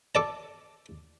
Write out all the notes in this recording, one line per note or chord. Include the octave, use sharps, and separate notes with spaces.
A4 D5 A5